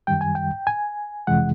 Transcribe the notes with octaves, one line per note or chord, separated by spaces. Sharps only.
F#2 D#3 G3 G5
G#5
G5
G#5
F2 C3 E3 G#3 F#5